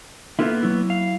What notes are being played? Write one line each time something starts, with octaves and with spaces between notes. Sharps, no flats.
A#3 B3 E4 F4 A4
F#3 E4
F5